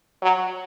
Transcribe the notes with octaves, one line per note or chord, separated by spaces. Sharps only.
F#3